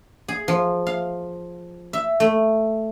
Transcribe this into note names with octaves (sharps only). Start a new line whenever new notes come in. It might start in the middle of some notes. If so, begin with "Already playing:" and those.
G#4
F3
F5
E5
A3